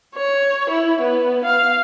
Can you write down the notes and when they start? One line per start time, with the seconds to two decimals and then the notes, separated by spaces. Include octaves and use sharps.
0.15 C#5
0.70 E4
1.01 B3
1.44 F5